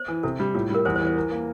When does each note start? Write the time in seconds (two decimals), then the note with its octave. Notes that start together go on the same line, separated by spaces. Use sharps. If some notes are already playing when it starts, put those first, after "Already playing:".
Already playing: C5
0.08 E3
0.23 C3 A4
0.40 G3
0.54 A2 F4
0.70 G3 A#4
0.85 E2 C5
0.96 C5
1.01 E3
1.07 C5
1.16 A#4
1.31 A#3